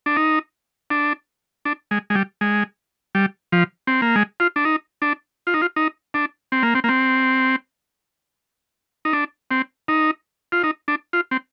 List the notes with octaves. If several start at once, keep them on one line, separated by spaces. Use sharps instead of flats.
D4
D#4
D4
D4
G#3
G#3
G3
G#3
G3
F3
C4
A#3
G#3
F4
D4
D#4
D4
F4
D#4
F4
D#4
D4
C4
A#3
C4
A#3
C4
D#4
D4
C4
D#4
F4
D#4
D4
F4
C4